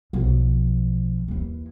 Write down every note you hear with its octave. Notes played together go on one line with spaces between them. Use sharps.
B1 F3
D#2 E3